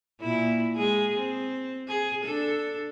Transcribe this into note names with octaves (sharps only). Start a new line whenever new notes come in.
A#2 E4
G#3 G#4
C4
G#4
D4 A4